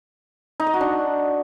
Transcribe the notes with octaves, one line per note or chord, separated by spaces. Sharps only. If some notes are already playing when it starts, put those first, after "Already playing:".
D#4
D#5
F#4
D4